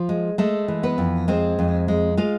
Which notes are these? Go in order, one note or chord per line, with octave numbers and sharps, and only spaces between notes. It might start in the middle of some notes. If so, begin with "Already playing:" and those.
Already playing: F3 F4
G#3
G#3 A3 A4
E3
B3 B4
F2
G#3 C4 C5
F2
G#3
G#3 F4 F5